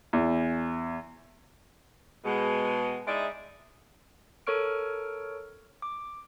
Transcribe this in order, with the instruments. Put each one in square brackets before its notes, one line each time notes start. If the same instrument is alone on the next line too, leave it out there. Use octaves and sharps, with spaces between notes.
[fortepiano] E2
[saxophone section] B2 G#3
G#3 D#4 E4 D5 E5
[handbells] A4 A#4 C#5 C#6 F6 D7
D6